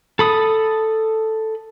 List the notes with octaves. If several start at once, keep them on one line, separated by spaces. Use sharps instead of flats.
A4 B5 D#6